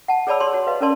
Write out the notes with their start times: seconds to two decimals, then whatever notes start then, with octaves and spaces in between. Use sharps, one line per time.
0.08 F#5 A5
0.27 G#4 C#5 D5 A5 B5 E6
0.40 G4 C#5 D5 C6
0.53 F#4 C#5
0.67 B4 D#5 F5
0.80 C#4 A4 A#4 D5 A5 C6